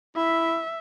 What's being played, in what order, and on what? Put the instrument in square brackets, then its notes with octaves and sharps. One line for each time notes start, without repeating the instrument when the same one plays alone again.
[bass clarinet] E4 [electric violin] E5